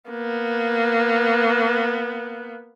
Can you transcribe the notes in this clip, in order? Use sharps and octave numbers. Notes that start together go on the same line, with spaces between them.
A#3 B3